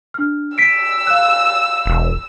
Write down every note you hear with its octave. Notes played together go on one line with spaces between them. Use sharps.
D4 F6
E6 B6 C7 D7
F5 F#6
E1